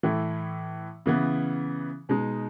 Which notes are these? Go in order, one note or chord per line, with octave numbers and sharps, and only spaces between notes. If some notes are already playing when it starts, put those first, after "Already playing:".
A2 E3 A3 E4
C#3 E3 B3
B2 G#3 D#4